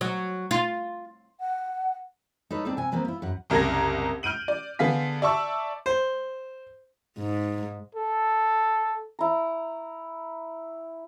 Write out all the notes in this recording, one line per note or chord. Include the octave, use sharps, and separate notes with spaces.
F#3
F4
F#5
D#4 A4 B4 C#5
C4 D4 D#4 A4
C3 G#5
F3 A#3 C4 B4 C5
E4 F4
F#2 F#5
F#1 C2 A#4 G#6 A#6
F6 G6 D7 D#7 F#7
D5
D3 B3 G#4 F5 B6
D5 E5 A5 C#6 E6
C5
G#2
A4
E4 A#5